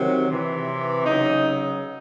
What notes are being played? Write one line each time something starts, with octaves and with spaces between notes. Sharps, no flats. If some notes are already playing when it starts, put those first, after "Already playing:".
Already playing: C3 D#3 F#3
C3 E3
C#3 F#3 D#4